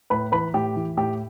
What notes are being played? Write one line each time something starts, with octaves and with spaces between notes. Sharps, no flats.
A2 B4 B5
E3 B4 B5
A2 G4 G5
E3
A2 G4 G5